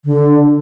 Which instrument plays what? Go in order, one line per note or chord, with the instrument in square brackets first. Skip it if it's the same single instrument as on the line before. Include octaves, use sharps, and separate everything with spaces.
[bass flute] D3